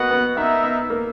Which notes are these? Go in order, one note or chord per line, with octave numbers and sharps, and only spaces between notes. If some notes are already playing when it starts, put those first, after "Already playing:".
Already playing: A#3 B3 F#4 B4 D#5 F#5
B3
B3 D#4 A#4 E5
B3
A#3